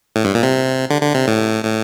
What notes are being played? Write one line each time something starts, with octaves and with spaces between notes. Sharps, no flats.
A2
G2
A#2
C3
D3
D3
C3
A2
A2